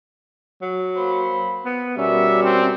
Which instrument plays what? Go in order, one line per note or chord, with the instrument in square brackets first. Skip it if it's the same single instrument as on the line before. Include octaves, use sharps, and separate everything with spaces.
[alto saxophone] F#3
[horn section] A#3 C5 B5
[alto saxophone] B3
[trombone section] B2 G3 F#4 [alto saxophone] C#4 [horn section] A#4 D5 [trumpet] E5
[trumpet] C4